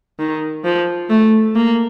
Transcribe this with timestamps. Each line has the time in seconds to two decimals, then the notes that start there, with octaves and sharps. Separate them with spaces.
0.19 D#3
0.65 F3
1.10 A3
1.55 A#3